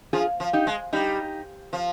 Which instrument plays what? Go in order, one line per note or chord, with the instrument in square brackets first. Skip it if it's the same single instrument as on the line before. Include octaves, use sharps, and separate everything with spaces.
[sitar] F3 [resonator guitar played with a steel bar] F4 G#4
[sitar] F3
[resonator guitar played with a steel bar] D#4 G4
[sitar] G#3
[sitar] G3 [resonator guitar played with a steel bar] D#4 G4
[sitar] F3